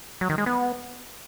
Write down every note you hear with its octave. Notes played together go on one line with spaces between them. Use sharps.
F#3
D#3
G#3
B3